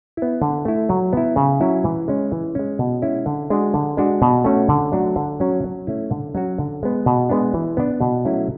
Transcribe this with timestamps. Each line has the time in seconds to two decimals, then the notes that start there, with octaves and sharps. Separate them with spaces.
0.17 B3 E4
0.42 D3
0.65 A3 E4
0.89 F#3
1.13 B3 E4
1.36 C#3
1.61 F#3 C#4 E4
1.84 E3
2.08 G#3 C#4
2.32 E3
2.55 G#3 C#4
2.79 B2
3.02 G#3 C#4 E4
3.26 D3
3.50 G#3 D4 F#4
3.74 D3
3.97 G#3 D4 F#4
4.22 B2
4.44 A3 C#4 F#4
4.69 D3
4.92 F#3 A3 D4 F#4
5.16 D3
5.40 F#3 C#4 F#4
5.64 F#3
5.87 A3 C#4 E4
6.10 D3
6.35 F#3 C#4 F#4
6.58 D3
6.83 G#3 B3
7.06 B2
7.29 G#3 B3 D4
7.54 E3
7.77 B3 D4
8.01 B2
8.25 F#3 A3 C#4 E4